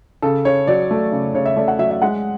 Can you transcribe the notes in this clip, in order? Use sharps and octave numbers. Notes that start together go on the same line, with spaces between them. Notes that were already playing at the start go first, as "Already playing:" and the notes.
C#3 A4
C#3 C#5
F#3 D5
A3
C#3
C#3 C#5
E5
A3 D5
F#5
F#3 E5
E5
G#3 F#5